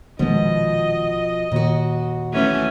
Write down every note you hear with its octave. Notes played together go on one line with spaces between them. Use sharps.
A#1 B2 D#3 F3 G#3 D#5
D#2 A#2 D#3 F#4
E3 A3 C#4